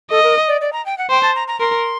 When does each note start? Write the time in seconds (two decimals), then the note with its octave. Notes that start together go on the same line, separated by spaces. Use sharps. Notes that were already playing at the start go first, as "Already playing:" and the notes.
0.11 A4 D#5
0.23 A#4
0.48 D5
0.61 D5
0.73 A#5
0.86 G5
0.98 F#5
1.10 C5 G5
1.22 A5
1.35 A#5
1.48 A#5
1.60 A#4 C6